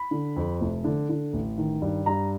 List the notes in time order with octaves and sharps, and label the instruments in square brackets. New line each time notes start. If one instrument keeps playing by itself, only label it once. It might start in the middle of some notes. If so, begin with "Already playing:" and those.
Already playing: [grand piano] B5
D3
F2
F1
D3
D3
A1
D#3
G2
G2 A#5